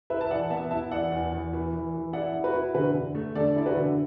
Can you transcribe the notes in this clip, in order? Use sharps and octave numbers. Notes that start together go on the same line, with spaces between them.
E4 B4 E5
A5
E3 D5 F#5
B3 E5 A5
E4 E5 A5
E3 D5 F#5
E2
E2
E3
E3
E3
E4 D5 F#5
E4
F#4 B4
E4
D3 F#4 B4
D3
A3
D3 A4 D5
E4 D5
F#4 B4
D3